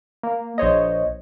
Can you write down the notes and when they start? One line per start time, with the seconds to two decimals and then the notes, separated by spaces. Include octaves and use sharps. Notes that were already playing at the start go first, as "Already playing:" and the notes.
0.23 A#3
0.58 A#1 C5 C#5 D#5